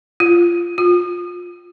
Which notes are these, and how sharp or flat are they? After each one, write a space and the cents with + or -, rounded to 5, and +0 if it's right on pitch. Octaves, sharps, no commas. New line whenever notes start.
F4 -15
F4 +15